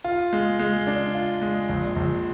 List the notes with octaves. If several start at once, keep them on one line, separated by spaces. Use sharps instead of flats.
F4
G#3
G#3
D4
F4
G#3
A#1
A#1